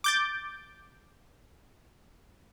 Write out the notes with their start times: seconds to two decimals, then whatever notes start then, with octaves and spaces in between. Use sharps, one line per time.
0.04 D6 G6 A6